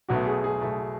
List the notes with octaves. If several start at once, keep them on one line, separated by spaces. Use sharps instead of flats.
B1 B2 A3 F#4
G#4
G#4
B1 B2 A3